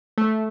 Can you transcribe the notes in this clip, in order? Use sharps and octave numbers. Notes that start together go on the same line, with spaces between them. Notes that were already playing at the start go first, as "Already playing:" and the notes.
A3